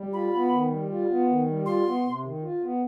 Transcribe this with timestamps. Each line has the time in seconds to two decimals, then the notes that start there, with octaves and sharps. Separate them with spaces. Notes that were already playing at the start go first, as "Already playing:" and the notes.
Already playing: G3
0.13 F4 B5
0.33 B3
0.51 D#3
0.70 G3
0.90 F4
1.08 B3
1.28 D#3
1.47 G3
1.66 F4 C6
1.85 B3
2.04 C3
2.23 D#3
2.43 F4
2.62 B3